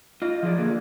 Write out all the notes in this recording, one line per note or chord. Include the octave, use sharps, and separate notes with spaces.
F4 D#5
F3 G#4 D5
D3 A#3 G#4